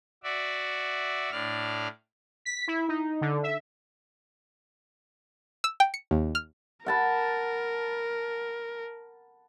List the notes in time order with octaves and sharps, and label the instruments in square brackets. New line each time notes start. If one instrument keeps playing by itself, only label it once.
[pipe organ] F#4 D5 E5
A2 D4 D5 F6
[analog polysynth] B6
E4
D#4
D3
E5
[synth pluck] E6
G5
C#7
D#2
F6
[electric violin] A#4 [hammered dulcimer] F#5 A5 B5